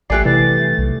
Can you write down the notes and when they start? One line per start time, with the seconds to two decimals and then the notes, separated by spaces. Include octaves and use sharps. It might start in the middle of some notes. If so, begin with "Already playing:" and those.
0.10 A1 G3 A3 G4 D5 G#5 F#6 C7
0.26 C3 E3 A6
0.78 B1